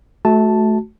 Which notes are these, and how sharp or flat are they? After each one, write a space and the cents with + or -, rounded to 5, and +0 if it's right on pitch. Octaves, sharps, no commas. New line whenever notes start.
A3 -25 F#4 +0 A5 +0